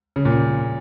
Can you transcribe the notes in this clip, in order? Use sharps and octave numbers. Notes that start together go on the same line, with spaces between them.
C#3
A#2